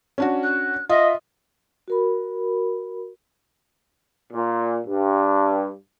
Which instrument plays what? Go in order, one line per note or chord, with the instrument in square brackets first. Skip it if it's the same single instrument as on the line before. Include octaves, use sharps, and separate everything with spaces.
[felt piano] C#4 D4 F#4
[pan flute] F#6
[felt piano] F4 [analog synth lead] D#5 [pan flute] E5
[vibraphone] F#4 A#4 B5
[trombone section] A#2
G2